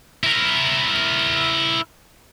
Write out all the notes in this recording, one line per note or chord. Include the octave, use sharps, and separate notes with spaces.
E4 A#4